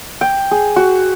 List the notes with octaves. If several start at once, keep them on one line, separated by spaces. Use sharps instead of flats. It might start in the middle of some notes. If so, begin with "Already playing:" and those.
G5
G#4
F#4